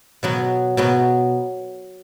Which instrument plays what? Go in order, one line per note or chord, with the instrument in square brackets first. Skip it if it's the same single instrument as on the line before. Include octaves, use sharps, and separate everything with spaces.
[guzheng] B2 F#3 B3
B2 F#3 B3